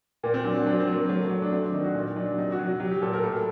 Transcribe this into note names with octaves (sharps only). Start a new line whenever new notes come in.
A#2 A#3
C4
F#3 D4
F#4
F#3 D4
C4
F#3
A#3
F#3 A3
A3
F#3
D4
F#3 C4
D4
D#3 D#4
F#4
A#2 D#4
F#3 D4
C3 D#4
F#4
F#3
F#4
F#3 G4
G4
A#2 A4
A#4
A2 A4